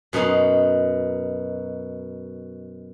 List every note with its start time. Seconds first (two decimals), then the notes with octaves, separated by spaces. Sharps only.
0.13 F#2 B2 D#4 C6